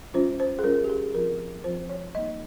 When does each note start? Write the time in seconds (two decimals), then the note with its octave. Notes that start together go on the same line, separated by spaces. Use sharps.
0.14 G3 C#4 F4 C5
0.40 C5
0.59 G#4
0.64 G3 C#4 F4 A#4
0.84 G4
0.89 G#4
1.14 F3 C4 F4 A#4
1.64 F3 C4 F4 C5
1.89 C#5
2.15 G3 A#3 D#4 D#5